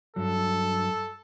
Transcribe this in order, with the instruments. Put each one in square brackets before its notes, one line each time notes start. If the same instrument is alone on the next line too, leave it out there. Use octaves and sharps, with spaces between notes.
[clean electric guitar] G2 F#3 [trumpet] A4